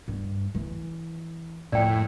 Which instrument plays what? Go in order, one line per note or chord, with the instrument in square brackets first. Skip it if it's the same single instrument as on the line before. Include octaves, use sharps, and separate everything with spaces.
[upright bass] G2
E3
[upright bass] F2 [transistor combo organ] A2 [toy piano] D5 G5